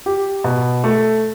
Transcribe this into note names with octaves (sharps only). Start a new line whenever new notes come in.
G4
B2
A3